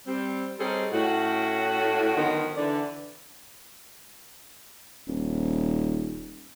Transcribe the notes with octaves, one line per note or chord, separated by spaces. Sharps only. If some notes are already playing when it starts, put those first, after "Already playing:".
G3 C4
G3 C4 C#4 D#4 G#4 A4
A2 C#4 F#4
D3 D#3 F3 F#3 B3
D3 E3 D5
D#1